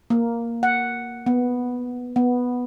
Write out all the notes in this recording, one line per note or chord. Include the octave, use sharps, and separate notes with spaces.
A#3
F#5
B3
B3